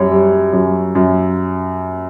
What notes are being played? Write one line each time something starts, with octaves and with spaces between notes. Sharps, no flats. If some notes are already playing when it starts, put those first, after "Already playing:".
Already playing: F#2 G3 C#5
G3
F#2
F#2